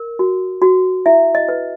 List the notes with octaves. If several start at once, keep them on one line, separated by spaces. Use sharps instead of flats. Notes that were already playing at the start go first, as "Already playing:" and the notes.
Already playing: A#4
F#4
F#4
E4 E5
D#5
B4